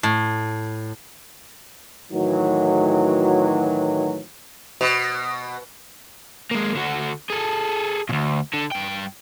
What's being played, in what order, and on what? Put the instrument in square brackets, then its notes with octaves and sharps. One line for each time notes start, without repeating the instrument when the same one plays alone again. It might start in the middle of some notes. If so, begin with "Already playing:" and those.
[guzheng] A2
[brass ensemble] A2 D#3 E3 F#3
[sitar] B2
[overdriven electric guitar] G#3 A#3
D3 F#4
G#4 A4
D2 A#2
D3
G2 G5